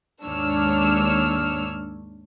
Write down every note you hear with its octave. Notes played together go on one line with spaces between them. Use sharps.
D#2 G#2 D4 C#5 E6 F6